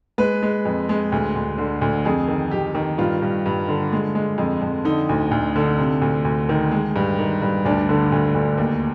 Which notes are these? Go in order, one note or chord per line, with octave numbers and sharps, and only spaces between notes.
G#3 B4
G#3
F2
G#3
D2
D2
D3
D2
F2 G#4
D#3
F2 G4
D#3
G2 F4
G2
G2
D3
G#3
G#3
F2
F2
D3 D#4
D2
D2
D3
C3
D2
D2
D#3
G#3
G2
D#3
G2
D2 D4
D3
D2
D2
D#2